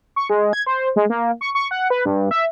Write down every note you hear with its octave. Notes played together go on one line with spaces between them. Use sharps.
C#6
G#3
G#6
C5
G#3
A#3
C#6
C#6
F#5
B4
G2
E5